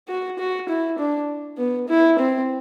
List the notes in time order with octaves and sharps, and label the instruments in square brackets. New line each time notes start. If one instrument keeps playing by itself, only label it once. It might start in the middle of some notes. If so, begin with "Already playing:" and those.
[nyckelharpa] F#4
F#4
E4
D4
B3
E4
C4